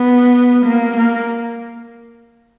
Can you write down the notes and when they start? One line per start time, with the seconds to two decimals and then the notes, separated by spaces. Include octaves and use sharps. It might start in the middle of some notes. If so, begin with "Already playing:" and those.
Already playing: B3
0.65 A#3
0.96 A#3